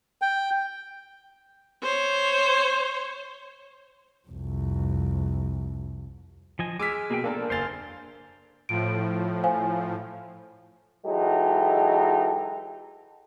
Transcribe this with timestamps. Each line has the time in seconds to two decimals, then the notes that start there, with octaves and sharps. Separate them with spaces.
0.22 G5
1.83 C5 C#5
4.28 C2 F2
6.59 F3 D#5 G#5
6.80 G#3 G#5 D6 E6 F6 B6
7.10 B2 A#3 G#4 G5
7.24 A#3 D4 A4 A#4
7.50 F#1 C5 F5 G#5 C6 A6
8.69 A2 F3 D7
9.44 C5 F5 G#5
11.06 E3 F#3 G#3 D#4 G4 A4